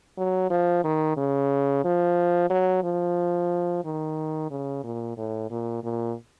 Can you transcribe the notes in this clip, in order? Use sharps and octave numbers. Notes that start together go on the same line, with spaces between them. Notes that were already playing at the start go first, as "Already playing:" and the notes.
F#3
F3
D#3
C#3
F3
F#3
F3
D#3
C#3
A#2
A2
A#2
A#2